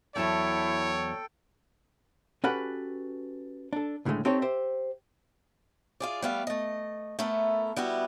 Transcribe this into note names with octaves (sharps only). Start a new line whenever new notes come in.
E2 F#3 E4 A4 C#5 G5 A5
C#4 F#4 G4 A4 B4 F#5
D4 A4
C#2 A2 D3 D#3 G#3 A3
C4 D#4 G4 A4 C5 C#5
G4 C5 E5
F4 G#4 D5
G3 A3 B3 A4 F5
A3 D#5
A3 B3 E4 A4 A#4
G3 B3 E4 F#4